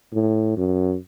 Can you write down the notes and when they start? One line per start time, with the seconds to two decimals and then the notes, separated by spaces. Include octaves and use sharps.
0.13 A2
0.57 F#2